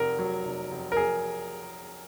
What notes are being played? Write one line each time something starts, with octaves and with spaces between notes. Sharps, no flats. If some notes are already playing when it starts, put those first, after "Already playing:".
Already playing: F1 A#4
F#3
F1
F1
A#4
G#4